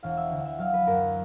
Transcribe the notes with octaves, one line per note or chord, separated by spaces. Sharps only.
E1 F5
E5
D2
E5
F#3 F5
B4
F#2 A#4